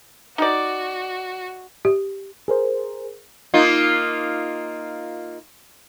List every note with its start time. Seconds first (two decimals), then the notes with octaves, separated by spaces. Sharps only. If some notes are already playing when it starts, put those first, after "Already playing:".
0.38 D#4 F#4 D5
1.85 G4
2.48 G#4 A#4 C5
3.54 A#3 D#4 F4